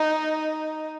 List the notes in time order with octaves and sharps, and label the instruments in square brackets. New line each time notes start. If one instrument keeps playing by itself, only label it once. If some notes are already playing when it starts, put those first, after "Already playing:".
Already playing: [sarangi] D#4